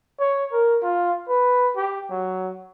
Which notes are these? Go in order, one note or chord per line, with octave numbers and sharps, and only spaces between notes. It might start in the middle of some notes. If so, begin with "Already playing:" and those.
C#5
A#4
F4
B4
G4
F#3